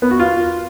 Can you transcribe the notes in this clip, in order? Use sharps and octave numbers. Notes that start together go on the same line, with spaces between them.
B3
F#4
F4